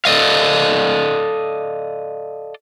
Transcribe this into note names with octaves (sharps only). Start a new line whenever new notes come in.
A4 D5 D#5 F5